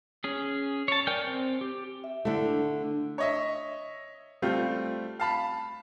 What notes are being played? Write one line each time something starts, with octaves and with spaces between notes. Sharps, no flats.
C#4 G#4
C#5 A5
A#4 D5 G5 G#5 G6
C4
G4
E5
D3 A3 E4
D4
C#5 D#5 E5
G3 A3 C4 F4
F5 A5 B5